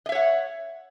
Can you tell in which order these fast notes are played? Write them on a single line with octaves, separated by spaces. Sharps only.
D#5 E5 C#5 F#5